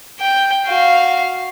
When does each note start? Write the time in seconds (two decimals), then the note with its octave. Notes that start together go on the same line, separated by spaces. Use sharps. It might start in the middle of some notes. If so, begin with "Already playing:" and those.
0.20 G5
0.67 F#4 F5